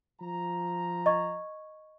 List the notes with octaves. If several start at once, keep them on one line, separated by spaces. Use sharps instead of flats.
F3 A#5
D#5 C#6 G#6